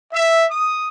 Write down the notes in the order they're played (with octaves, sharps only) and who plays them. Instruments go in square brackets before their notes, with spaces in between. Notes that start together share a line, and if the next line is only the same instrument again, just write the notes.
[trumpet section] E5
D#6